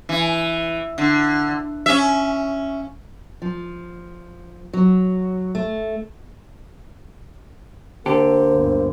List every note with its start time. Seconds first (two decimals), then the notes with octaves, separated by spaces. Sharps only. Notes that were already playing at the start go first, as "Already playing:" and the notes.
0.09 E3
0.98 D3
1.86 C#4 E5
3.42 F3
4.73 F#3
5.55 A3
8.06 D3 A#3 G4 A4 C5
8.52 G1 D2